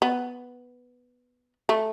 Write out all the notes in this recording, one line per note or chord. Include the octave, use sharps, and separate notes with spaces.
B3
A3